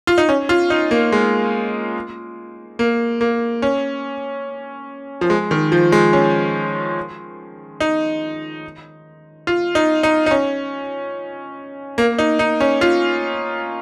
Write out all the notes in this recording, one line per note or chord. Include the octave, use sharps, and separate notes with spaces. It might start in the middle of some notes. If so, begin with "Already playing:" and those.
F4
D#4
C#4
F4
D#4
A#3
G#3
A#3
A#3
C#4
F3
G#3
D#3
F3
G#3
C#4
D#4
F4
D#4
D#4
D#4
C#4
A#3
D#4
D#4
C#4
F4